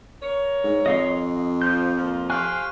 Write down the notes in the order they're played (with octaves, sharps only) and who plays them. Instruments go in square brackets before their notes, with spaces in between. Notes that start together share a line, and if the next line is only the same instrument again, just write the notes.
[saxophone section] A#4 C#5
[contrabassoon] G#2
[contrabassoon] F2 [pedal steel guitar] D#5 F5 C6
[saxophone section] F3 [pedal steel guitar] G6
[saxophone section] F3 A#3
[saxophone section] G4 C5 F5 [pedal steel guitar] G#5 C#6 F#6